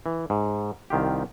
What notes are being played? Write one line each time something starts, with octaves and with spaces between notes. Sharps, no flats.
E3
G#2
C2 D#3 F4 G4